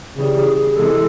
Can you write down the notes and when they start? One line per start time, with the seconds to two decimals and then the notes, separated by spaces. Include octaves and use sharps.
0.16 C#3 E3 G3 G#4
0.37 G#4
0.57 G#4
0.76 C3 E3 G#3 A4